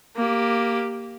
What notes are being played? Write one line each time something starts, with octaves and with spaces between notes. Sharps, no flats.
A#3 G4